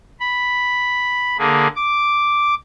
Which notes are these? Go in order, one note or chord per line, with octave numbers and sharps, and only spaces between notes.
B5
D3 A#3 G#4
D6